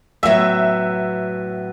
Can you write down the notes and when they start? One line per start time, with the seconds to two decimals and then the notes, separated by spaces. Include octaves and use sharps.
0.23 A2 F#3 B3 E5